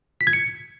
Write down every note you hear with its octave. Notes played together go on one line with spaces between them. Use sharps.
B6
G#6
C#7